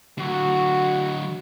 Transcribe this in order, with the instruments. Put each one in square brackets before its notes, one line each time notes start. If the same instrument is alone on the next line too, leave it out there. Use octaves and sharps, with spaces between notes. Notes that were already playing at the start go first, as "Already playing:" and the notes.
[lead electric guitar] D3 F#3 [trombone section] F#4